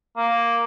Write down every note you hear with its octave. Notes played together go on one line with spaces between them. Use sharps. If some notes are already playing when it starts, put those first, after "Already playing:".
A#3